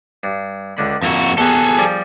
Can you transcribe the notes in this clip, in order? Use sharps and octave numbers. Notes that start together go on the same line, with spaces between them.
G2
C#2 D3 B5
F2 A#3 F#4 E5
E2 B3 G#4 A4
F3 G3